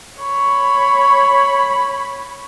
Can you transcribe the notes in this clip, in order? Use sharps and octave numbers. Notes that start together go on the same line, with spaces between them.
C#5 B5